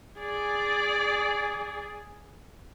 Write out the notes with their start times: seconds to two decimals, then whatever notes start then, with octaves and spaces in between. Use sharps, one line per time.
0.19 G#4 D5